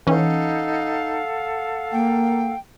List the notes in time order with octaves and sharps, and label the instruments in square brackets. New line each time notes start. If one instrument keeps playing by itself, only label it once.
[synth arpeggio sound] E3 C#4 [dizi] D#4 [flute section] A4 F5 F#5
[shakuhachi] A#3 [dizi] G5